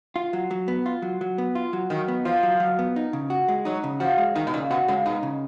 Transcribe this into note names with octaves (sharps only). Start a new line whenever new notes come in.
F4
F#3
F#3
B3
F4
F#3
F#3
B3
F4
F#3
D#3 F#3
B3
F3 F4
F#3
F#3
B3
D#4
C#3
F#4
G#3
F#3 D#4
C#3
F3 F#4
G#3
D#3 D#4
B2
A#2 C#3
B2 F#4
C#3 G#3
B2 D#4
C#3